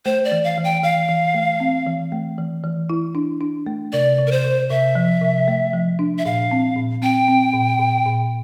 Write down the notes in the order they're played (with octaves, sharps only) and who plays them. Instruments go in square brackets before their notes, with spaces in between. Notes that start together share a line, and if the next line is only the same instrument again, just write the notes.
[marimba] A3 [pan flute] C5
[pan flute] D5
[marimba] E3
[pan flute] F5
[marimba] E3
[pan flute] G5
[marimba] E3 [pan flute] F5
[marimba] E3
A3
C4
E3
A3
E3
E3
E4
D4
D4
A3
[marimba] C3 [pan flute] D5
[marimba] C3
[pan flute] A#4
C5
[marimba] C3
[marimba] C3 [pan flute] E5
[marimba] F3
C3
A3
F3
D4
[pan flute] E5
[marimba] A#2 [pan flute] F5
[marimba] C4
A#2
[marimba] C4 [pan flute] G5
[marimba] C4
A#2
A#2
A#2